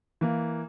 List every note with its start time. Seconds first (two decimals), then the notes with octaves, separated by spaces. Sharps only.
0.21 E3 A#3